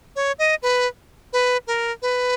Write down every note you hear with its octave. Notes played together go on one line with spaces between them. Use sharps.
C#5
D#5
B4
B4
A#4
B4